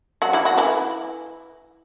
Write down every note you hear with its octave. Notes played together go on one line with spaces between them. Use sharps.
F#3 F#4
E3 E4
F#3 F#4
E3 E4